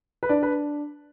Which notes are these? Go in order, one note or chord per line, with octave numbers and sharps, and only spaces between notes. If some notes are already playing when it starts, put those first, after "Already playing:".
B4
D4 D5
B4